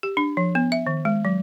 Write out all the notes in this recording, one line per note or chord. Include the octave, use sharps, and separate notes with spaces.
G4
D4
F3
B3
E5
D#3
G#3
F#3